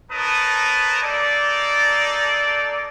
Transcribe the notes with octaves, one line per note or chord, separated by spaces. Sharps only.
D#4 A#4 B4 C#5 A5 D#6
A#3 D#4 A4 D5